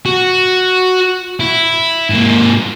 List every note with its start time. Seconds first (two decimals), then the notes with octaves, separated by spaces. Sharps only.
0.06 F#4
1.40 E4
2.10 G#2 A#3